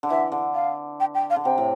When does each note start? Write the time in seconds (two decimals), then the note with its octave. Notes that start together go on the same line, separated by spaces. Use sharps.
0.03 D3
0.10 E3 E5
0.32 D3
0.54 F5
1.00 G5
1.15 G5
1.30 F5
1.36 D3
1.44 C3 G5
1.58 A2